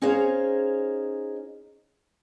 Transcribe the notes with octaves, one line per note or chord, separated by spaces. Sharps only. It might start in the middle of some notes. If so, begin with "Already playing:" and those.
C#4 D#4 G#4 C5 C#5 F5